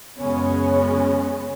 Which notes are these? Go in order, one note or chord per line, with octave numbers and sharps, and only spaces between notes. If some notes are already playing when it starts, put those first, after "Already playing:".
F#2 C#3 G#3 B3 C#4